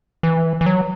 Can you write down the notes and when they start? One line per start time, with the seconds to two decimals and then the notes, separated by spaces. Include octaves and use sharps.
0.23 E3
0.61 E3
0.66 F#3